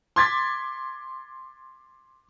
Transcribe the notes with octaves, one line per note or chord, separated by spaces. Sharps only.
C6 D6 G#6 A6 B6